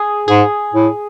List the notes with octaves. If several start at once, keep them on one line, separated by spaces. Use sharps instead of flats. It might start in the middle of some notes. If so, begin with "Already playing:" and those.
Already playing: G#4
G#2 G#4
A2